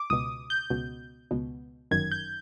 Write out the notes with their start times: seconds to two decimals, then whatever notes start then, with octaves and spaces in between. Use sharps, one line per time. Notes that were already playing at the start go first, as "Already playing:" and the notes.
Already playing: D6
0.10 C#2 B2 D#6
0.50 G6
0.70 C#2 B2
1.31 C#2 B2
1.91 G1 F#2 D#3 G#6
2.12 G6